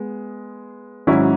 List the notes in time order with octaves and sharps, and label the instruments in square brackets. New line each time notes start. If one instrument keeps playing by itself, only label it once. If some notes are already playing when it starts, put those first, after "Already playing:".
Already playing: [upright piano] G#3 B3
G#1 G#2 F#3 C#4 E4